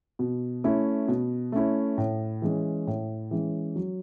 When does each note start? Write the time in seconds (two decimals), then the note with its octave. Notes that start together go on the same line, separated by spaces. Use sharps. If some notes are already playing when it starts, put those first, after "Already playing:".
0.19 B2
0.64 A3 C#4 E4
1.08 B2
1.52 A3 C#4 E4
1.98 A2
2.42 E3 G#3 C#4
2.87 A2
3.31 E3 G#3 C#4
3.76 F#3